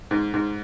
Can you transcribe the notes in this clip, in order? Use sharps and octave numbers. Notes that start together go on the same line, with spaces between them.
G#2
G#2